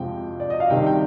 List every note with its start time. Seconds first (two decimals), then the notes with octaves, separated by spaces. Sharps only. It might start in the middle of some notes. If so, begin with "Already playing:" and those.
Already playing: F2 C3 F3 G#3 G5
0.40 D5
0.50 D#5
0.60 F5
0.70 C3 D#3 G3 D4 G5
0.86 G5